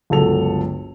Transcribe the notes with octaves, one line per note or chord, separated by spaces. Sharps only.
G1 C#2 F#3 A4 F7